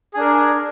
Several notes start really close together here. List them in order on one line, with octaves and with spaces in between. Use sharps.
G#4 D4 A#4